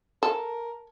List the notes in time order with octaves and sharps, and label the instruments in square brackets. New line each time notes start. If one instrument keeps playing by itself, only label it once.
[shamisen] A4 [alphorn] A#4